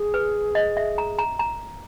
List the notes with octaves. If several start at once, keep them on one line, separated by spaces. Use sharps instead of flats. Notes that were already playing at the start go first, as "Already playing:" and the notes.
Already playing: G#4
B4
D#5
E5
A#5
A#5
A#5